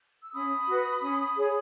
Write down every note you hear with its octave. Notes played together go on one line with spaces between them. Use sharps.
E6
C#4 B5 D#6
F#4 B4
C#4
G#4 C#5